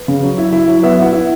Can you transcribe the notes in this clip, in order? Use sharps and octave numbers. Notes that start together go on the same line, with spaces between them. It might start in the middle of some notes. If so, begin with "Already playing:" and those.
Already playing: B4
C#3
F#3
E4
E4
F#3
B3 E5
E4 F#5
E4